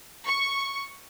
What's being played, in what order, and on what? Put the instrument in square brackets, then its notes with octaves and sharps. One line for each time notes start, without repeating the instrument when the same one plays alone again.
[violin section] C#6